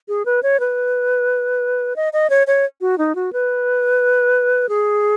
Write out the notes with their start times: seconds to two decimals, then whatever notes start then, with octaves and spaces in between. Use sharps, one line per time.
0.08 G#4
0.26 B4
0.43 C#5
0.60 B4
1.96 D#5
2.13 D#5
2.30 C#5
2.47 C#5
2.81 F#4
2.98 D#4
3.15 F#4
3.33 B4
4.69 G#4